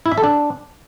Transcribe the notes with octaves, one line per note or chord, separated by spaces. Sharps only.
E4
E5
A4
D4